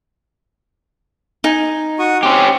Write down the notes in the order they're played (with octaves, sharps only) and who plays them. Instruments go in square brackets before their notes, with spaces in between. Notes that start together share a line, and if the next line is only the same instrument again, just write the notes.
[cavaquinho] D#4 G#5
[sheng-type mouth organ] F#4 C#6 D#6
[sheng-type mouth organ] C4 [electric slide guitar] C#4 G4